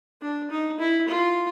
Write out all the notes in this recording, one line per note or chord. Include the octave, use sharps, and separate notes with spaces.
D4
D#4
E4
F4